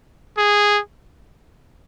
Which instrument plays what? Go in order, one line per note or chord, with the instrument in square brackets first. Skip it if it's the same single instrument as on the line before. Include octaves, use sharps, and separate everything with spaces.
[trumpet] G#4